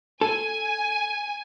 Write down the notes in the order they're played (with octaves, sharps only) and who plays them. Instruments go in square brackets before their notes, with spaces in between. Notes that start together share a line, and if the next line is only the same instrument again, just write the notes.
[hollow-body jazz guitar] A4 [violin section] G#5